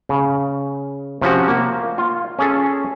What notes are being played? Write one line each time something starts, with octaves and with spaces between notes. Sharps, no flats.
C#3
C3 F3 C#4 F#4
A#3
F4
C#4 G#4 A4